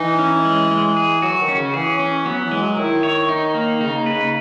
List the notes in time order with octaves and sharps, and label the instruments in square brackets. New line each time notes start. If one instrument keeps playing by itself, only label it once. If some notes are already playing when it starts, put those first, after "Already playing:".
Already playing: [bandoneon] E3 [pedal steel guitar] D#4
[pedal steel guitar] C#4
G#3
G#3
G#4
[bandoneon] F#3 [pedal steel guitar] F#4
[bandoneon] D#3
[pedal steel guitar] C#4
[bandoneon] C#3
[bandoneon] E3 [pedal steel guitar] G#4
[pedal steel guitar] C#4
[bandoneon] F#3 [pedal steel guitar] B3
[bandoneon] E3
[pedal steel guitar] G#3
[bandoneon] F#3
[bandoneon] D#3 [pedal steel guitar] E4
[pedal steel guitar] C#5
D#4
A#3
[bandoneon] C#3 [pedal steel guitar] D#4
[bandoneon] C#3
[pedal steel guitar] B4
[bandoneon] C#3